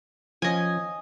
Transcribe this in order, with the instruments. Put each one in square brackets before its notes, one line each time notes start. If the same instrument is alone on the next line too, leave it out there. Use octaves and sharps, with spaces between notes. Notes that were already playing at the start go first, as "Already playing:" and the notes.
[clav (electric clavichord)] F3 C#4 [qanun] D#5 G#5